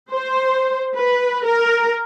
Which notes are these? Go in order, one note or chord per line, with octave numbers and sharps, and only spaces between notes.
C5
B4
A#4